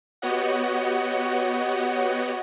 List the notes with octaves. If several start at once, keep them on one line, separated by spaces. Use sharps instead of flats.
B3 F#4 G4 C#5 D#5 F#5